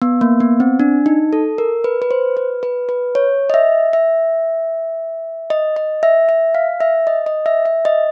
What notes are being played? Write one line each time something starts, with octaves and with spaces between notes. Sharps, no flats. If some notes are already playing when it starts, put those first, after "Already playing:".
B3
A#3
B3
C4
D4
D#4
A4
A#4
B4
B4
C5
B4
B4
B4
C#5
D#5
E5
E5
D#5
D#5
E5
E5
F5
E5
D#5
D#5
E5
E5
D#5